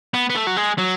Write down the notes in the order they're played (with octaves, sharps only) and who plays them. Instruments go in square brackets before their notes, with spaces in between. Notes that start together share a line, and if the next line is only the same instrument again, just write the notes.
[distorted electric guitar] B3
B3
A3
F#3
G#3
F#3